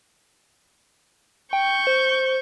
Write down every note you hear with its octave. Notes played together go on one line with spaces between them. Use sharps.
G5 C#6 G6
C5